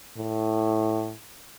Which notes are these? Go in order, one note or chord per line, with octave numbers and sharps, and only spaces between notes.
A2